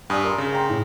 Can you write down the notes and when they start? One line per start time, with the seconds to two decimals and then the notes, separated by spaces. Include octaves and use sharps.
0.10 G2 D5 G#5 D#6
0.24 A#4 A#5 C6
0.38 C#3
0.53 G5 A#5 C6
0.69 A2